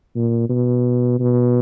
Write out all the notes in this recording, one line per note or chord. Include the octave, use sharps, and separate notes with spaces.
A#2
B2
B2